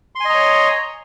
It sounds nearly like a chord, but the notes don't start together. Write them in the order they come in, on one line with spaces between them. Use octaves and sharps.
C6 G#5 D#5 A#5 C#5